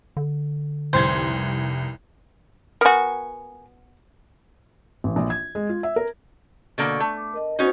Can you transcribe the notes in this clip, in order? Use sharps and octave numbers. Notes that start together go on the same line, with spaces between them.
D3
F1 C2 C5 G#6
B3 F#4 A#4 G#5
A1
A#1
G#6
G#3
F4
E5
A#4
B2 D3 A#3 C#6
A3
D6
A#4 D#5
B3 C#4 D#4 F#4 C5